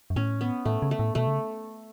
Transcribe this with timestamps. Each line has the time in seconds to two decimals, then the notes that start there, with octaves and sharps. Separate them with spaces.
0.10 F#2
0.16 A2 C#4
0.41 B3
0.65 A2 A3
0.82 C#3
0.91 A3
0.99 A2
1.15 B2 A3
1.27 C#3